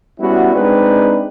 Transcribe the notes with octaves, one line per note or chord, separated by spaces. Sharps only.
G3 B3 C#4 E4 F#4
G#3 C4 D4 D#4 B4